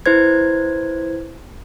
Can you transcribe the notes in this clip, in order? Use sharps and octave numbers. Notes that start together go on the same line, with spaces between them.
E4 B4 C5 G#6